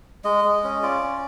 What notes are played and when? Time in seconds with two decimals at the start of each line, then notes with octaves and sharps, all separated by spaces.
0.25 G#3 D#5
0.44 G#3
0.64 C#4
0.83 F4 D5
1.03 C#4